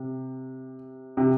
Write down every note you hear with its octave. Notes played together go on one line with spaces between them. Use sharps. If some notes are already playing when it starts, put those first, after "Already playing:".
Already playing: C3
C3